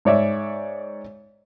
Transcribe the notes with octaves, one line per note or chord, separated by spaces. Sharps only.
G#2 C#5 D5 E5